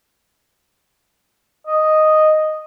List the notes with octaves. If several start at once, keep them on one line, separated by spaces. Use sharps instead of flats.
D#5